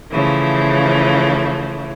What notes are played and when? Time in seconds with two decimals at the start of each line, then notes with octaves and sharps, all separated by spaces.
0.11 C#3 E3 F3 A3